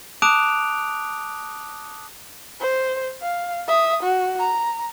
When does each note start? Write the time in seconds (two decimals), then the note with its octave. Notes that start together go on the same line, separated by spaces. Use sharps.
0.22 A5 D6 D#6 F#6 D7 F7
2.61 C5
3.22 F5
3.68 E5 D#6
4.03 F#4
4.39 A#5